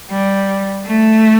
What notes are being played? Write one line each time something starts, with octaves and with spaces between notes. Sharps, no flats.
G3
A3